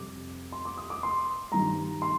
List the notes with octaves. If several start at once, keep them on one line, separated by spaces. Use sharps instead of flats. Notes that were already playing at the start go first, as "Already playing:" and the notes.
Already playing: F2 C3 G3 D6
C6
D6
D#6
D6
C6
G2 D#3 G3 A#5
C6